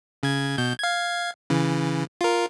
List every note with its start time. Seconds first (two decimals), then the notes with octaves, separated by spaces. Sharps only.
0.23 C#3 G#6
0.58 B2 G6
0.79 F5 G#6
1.50 C#3 E3
2.21 F4 A#4